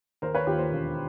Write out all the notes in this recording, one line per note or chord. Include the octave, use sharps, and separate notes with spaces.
D#2 A#4 C5
B4 C#5
D#2 F4 G4
A#4 C5
E1